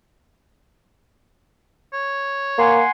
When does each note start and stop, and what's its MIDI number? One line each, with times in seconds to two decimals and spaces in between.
1.93 2.80 73
2.58 2.82 58
2.58 2.91 78
2.58 2.91 80
2.58 2.91 84